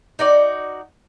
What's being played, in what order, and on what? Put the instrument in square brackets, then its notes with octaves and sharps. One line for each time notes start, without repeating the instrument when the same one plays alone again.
[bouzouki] D#4 F#4 D5